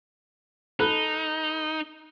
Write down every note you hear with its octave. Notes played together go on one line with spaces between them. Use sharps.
D#4 A4 B5 F#6